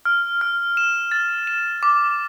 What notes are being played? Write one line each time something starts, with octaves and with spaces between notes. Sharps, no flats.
F6
F6
E7
A6
E7
D6